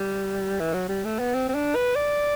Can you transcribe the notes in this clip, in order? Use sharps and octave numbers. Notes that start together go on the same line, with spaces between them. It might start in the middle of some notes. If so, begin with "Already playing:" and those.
Already playing: G3
E3
F#3
G3
A3
B3
C4
C4
D4
B4
D5